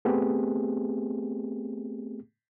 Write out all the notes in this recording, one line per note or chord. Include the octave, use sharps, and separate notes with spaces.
A3 B3 C4 G4 G#4